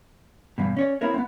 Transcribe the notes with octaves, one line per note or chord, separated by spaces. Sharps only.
E2 G2 B2
C#4 C#5 D5
B3 C4 E4 A#4 C#5
B3 C4